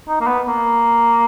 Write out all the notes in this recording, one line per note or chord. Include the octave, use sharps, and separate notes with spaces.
D#4
A#3
B3
A#3